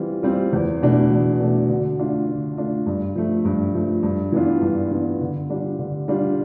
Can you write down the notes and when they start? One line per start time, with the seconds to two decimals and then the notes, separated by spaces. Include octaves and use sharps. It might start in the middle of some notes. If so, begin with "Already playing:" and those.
Already playing: E3 G3 C4 F4
0.23 G3 C4 F4
0.53 E2
0.82 B2 A3 D4
1.11 E2
1.40 B2 A3 D4
1.69 D3
1.99 A3 D4 F4
2.27 D3
2.57 A3 D4 F4
2.86 G2
3.16 F3 A3
3.45 G2
3.74 F3 A3
4.03 G2
4.32 E3 B3 D4 F4
4.61 G2
4.91 E3 B3 D4 F4
5.21 D3
5.50 G3 D4 F4
5.79 D3
6.08 G3 D4 F4